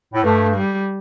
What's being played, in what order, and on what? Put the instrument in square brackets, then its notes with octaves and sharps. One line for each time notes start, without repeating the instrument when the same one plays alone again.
[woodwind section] A2
[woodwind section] G2 [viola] A3
[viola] G3